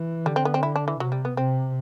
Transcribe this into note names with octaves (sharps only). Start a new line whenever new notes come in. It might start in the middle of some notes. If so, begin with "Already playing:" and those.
Already playing: E3
D3 G3
C4
B3
C4
E4
D4
E3
C3 F#3
G3
B3
C3 C4